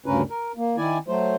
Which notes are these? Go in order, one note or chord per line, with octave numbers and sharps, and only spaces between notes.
D2 G2 C#3 C#4 A#4 B4
A#4
A#3
D#3 E4 D5 G#5
F#3 A3 C5